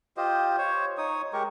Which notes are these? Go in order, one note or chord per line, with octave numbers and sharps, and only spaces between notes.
F4 G4 C5 D#5
C5 C#5
D#4 C#5 D#6
G#3 G4 A#4 C#6